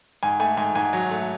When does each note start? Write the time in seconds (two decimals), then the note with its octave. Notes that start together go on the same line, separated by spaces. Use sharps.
0.23 G#2 G#5
0.40 A3 G#5
0.57 G#2 G#5
0.75 G#2 G#5
0.93 F#3
1.11 A3